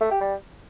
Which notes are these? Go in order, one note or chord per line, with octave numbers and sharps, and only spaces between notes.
A3
G4
G3